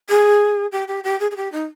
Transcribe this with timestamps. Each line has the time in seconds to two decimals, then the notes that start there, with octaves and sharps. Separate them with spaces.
0.09 G#4
0.72 G4
0.88 G4
1.04 G4
1.20 G#4
1.31 G#4
1.36 G4
1.52 D#4